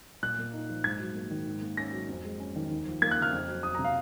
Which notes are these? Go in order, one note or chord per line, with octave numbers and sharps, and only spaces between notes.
A#2 F#6
A#3
D#4
F3
G#2 G#6
F#3
A#3
D#3
G#2
A#3
C#4 A#6
F#3
F2
G#3
C#4
D#3
D#2
F3
A#3 G#6
F#6
C#3
F6
F2
F#3
F2 D#6
C3 A#5
F5